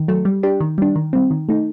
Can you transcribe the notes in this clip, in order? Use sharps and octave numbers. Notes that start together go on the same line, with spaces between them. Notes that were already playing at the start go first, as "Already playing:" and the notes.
Already playing: D#3
F#3 A3
G3
D4 G4
D#3
G3 D4
D#3
G3 C4
D#3
A3 D#4